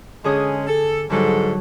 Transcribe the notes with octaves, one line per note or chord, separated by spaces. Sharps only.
D3 G#3 C#4 G#4 D#6
A4
G#2 D3 F#3 G3 A4